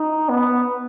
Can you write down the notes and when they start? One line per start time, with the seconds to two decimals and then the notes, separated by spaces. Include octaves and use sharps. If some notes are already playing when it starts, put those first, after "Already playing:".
Already playing: D#4
0.29 B3